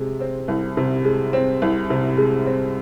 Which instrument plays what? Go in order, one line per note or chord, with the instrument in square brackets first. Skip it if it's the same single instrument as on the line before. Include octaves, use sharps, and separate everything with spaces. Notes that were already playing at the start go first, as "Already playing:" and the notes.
Already playing: [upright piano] C3 G#3
C4
C2
C3
G#3
C4
C2
C3
G#3
C4